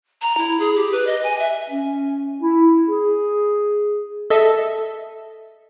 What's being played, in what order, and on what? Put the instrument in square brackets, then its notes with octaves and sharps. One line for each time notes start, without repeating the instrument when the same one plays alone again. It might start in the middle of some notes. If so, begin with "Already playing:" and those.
[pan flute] A#5
E4
G#4
G4
B4
D#5
G#5
E5
[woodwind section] C#4
E4
G#4
[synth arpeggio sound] A4 D#5 E5